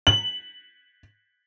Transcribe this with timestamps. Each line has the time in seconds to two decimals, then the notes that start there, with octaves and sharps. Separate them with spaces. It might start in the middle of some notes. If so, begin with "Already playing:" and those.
0.07 F#7